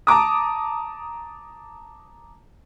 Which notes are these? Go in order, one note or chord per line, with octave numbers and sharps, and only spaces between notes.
A5 A#5 D6 D#6